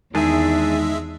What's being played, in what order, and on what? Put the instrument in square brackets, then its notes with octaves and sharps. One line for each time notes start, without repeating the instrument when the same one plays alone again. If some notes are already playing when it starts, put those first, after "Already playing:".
[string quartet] E2 [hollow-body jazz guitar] D#3 [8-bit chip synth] G#3 E5 [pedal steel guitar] D4 G#4